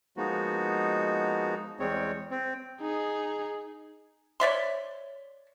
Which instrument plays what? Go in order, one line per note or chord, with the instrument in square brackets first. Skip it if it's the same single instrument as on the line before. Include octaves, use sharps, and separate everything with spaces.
[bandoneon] F3 G#3 A#3 B3 D#4 F#4
E2 G3 G#3 C4 C#5
C4
[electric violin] D#4 G#4
[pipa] C#5 D5 E5 C6